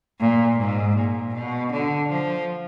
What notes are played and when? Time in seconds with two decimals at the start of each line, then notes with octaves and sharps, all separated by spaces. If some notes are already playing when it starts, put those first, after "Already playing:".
0.20 A#2
0.58 G#2
0.96 A#2
1.34 B2
1.72 D3
2.10 F3